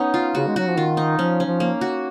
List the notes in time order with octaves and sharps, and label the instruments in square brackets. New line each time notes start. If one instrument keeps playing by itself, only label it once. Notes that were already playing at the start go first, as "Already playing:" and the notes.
Already playing: [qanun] B3 C#4 D#4
F4
[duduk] C#3 [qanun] F#4
[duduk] G#3
[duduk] F#3 [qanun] F#4
[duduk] F3
[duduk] D#3 [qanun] F4
[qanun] D#4
[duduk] F3 [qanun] C#4
[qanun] C#4
[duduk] F3
[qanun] A#3
F#4